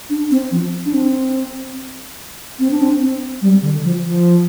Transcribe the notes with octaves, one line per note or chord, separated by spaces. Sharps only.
D4
C4
F3
D4
C4
C4
D4
C4
C4
G3
D3
F3
F3